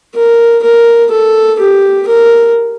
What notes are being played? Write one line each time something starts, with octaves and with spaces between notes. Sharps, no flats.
A#4
A#4
A4
G4
A#4